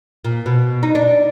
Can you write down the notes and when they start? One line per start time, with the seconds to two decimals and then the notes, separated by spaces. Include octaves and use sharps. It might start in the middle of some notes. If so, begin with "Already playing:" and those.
0.25 A#2
0.46 B2
0.83 D#4
0.95 D4